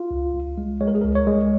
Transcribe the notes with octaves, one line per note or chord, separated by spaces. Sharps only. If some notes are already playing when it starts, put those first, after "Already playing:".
Already playing: F4
C#2
C#2
G#3
G#3 C#5
A#4
G#4
C#2 A#4
C#5
G#3